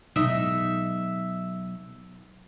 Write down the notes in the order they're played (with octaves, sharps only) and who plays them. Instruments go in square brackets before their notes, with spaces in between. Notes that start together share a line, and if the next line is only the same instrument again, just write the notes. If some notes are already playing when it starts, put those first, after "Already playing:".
[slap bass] B2 F#3 G#3 [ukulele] D#4 [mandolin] E5